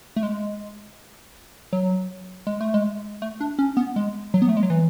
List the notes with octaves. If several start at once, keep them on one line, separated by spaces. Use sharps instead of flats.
A3
G#3
F#3
G#3
A3
G#3
A3
D4
C#4
B3
G#3
F#3
B3
A3
G#3
F#3
E3